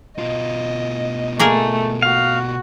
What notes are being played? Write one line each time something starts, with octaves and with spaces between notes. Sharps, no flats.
B2 F4 D#5
A3 A#3 G#4 A#4
F#4 F5